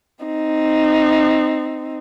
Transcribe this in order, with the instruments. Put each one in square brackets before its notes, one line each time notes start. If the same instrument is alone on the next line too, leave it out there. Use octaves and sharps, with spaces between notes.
[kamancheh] C4 D#4